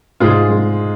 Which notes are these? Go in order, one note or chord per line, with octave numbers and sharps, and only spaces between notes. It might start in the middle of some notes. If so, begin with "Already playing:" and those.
G#2 F4 G#4
G#3